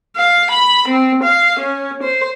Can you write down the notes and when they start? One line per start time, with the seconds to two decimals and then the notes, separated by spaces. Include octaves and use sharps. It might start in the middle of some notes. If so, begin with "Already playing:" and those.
0.16 F5
0.50 B5
0.88 C4
1.23 F5
1.59 C#4
2.03 C5